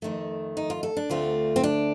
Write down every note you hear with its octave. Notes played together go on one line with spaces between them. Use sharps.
F2 D#3 A3
D#4
F4
A4
D4
D2 D3 A3 C4 F4
C4
D4